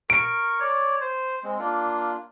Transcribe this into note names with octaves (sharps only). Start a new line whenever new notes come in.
A#4 C#6 D7
C#5 D5
C5
G#3 C4
A#3 D4 F4